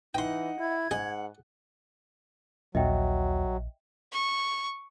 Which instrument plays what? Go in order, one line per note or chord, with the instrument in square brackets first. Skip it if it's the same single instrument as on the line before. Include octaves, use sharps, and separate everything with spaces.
[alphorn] E3 [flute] D#4 [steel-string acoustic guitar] D#5 F#5 [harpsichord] G5 C6
[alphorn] E4 [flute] G#6
[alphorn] G#2 [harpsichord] D#4 G#4 [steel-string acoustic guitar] F#5
[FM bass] A#1 [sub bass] D#2 [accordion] F#3 [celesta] D#5 E5 G5
[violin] C#6